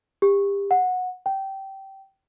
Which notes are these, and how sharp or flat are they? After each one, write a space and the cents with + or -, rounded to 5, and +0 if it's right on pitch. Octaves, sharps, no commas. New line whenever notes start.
G4 +30
F#5 -15
G5 -20